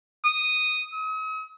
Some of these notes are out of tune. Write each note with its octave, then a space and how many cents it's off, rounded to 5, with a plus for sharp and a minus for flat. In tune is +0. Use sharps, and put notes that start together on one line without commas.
D#6 -5
D#6 +45